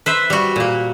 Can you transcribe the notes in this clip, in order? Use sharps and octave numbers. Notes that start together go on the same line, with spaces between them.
B4 C5 E5
G3 F#4
A#2 A#3